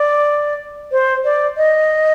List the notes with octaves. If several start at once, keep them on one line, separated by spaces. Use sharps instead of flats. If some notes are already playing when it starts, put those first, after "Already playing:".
Already playing: D5
C5
D5
D#5